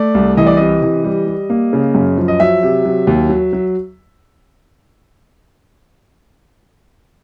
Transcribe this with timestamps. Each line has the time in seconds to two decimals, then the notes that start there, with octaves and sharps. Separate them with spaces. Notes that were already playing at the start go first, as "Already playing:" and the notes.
Already playing: A3 D5
0.15 C2
0.37 E3 D#5
0.47 D5
0.57 C3 D#5
0.82 E3
1.04 G3
1.27 G3
1.50 A#3
1.73 C#3
1.95 F#2
2.17 F3
2.28 D#5
2.40 F#3 E5
2.63 C3
2.85 F#3
3.07 D#2
3.30 F#3
3.53 F#3